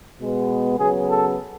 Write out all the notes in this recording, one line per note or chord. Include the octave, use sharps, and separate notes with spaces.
B2 G#3 B3
C#3 F#3 B3 G#4
A4